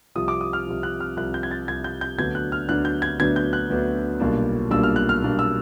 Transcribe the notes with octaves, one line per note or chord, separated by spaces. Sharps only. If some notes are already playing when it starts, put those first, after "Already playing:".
C2 C3 F3 D#6
D6
D#6
F6
C2 C3 F3
F#6
F6
C2 C3 F3 F#6
G6
G#6
A6
C2 C3 F3 G#6
G6
G6
D2 D3 F#3 B3 D4 G#6
F#6
F6
D2 D3 F#3 B3 D4 F#6
G6
G#6
D2 D3 F#3 B3 D4 G#6
G6
F#6
D2 D3 F#3 B3 D4
B1 A#2 G3 A#3 D4
B1 A#2 G3 A#3 D4 E6
F6
F#6
F6
B1 A#2 G3 A#3 D4
E6